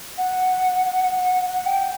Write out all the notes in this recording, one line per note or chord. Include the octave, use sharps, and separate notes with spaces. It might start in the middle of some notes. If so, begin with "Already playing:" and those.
F#5
F#5
G5